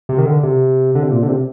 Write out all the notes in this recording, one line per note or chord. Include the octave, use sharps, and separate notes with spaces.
C3
D#3
D3
C3
D3
C3
A#2
D3
C3